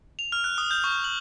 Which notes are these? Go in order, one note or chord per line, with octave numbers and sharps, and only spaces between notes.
F7
F6
F#6
D#6
G6
C#6
F#7